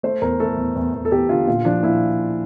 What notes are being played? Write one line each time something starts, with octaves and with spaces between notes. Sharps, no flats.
A3 C5
E2 A#4
A3 A4
E2
E2
E2
A4
E2 G4
D3 F4
A#2 F4
F3 D4
A#2 E4